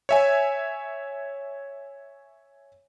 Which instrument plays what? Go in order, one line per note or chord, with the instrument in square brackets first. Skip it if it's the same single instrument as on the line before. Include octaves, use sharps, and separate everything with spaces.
[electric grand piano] C#5 E5 G#5